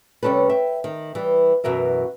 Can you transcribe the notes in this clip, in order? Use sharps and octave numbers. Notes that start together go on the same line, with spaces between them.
C3 G3 C#4 A4 B4
E5 G5
D#3
E3 G3
F#2 B2 E3 A#4 E5